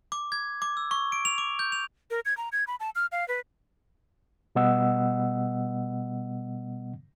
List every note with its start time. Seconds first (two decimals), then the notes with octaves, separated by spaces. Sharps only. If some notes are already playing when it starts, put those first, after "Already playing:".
0.12 D6
0.32 G#6
0.62 D6
0.77 E6
0.91 C#6
1.12 D7
1.25 F7
1.38 D6
1.59 G6
1.72 F7
2.11 A#4
2.25 G#6
2.37 A#5
2.52 G#6
2.67 B5
2.80 A5
2.95 F6
3.12 F5
3.28 B4
4.55 B2 G3 B3 D#5 F#5 E6